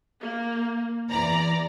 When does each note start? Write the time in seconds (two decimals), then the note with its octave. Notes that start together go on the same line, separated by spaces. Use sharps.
0.21 A#3
1.10 E2 E3 D5 A#5